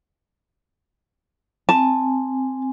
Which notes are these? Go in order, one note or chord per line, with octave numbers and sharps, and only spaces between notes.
C4 G#5 A5